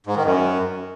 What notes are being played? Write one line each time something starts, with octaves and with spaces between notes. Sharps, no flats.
G#2
D#3
F#2